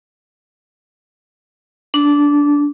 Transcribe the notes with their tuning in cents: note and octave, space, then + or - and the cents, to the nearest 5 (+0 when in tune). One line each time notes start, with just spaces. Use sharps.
D4 -15